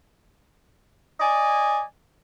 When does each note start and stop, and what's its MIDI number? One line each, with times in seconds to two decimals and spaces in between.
1.20 1.82 74
1.20 1.82 75
1.20 1.82 80